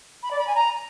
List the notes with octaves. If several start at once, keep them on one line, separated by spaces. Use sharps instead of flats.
B5
D5
B5
G#5
A#5